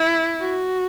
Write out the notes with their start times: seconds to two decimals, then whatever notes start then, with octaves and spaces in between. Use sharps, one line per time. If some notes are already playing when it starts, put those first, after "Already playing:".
Already playing: E4
0.40 F#4